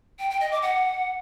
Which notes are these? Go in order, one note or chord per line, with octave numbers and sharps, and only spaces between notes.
G5
G5
D#5
D6
F#5